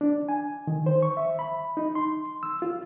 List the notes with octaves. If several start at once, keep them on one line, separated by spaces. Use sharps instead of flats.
D4
G#5
D#3
C5
C#6
E5
B5
D#4
C6
E6
F4